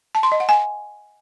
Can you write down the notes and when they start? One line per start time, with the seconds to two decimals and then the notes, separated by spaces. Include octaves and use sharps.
0.15 A5
0.23 C6
0.32 D#5
0.40 F#5
0.49 G#5